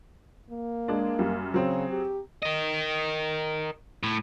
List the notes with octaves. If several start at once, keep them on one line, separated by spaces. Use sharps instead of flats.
A#3
G#3 D4
F#2 G3
C#3 F#3 C4 G#4
G4
A#4 D#5
A2